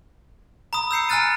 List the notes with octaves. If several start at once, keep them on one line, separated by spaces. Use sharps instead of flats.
A#5 B5 D#6
E6 G6 C7 C#7
G#5 A#5 F6 F#6 A6 D#7